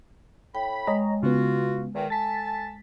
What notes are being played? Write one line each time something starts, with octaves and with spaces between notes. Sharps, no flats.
A2 G5 B5
G#3 C#5 D#5 A#5
C#3 B3 F4 F#4
E2 D#3
A4 G#5 A5 A6 B6